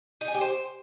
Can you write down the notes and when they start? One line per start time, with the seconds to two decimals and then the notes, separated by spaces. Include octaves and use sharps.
0.21 D#4
0.28 G#5
0.34 G4
0.41 C5